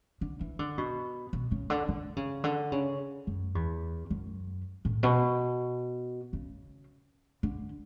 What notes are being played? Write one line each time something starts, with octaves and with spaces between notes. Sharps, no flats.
D3
E3
D3
B2
B2
C#3
D3
D3
C#3
D3
C#3
F#2
E2
F#2
A2
B2
C#3
D3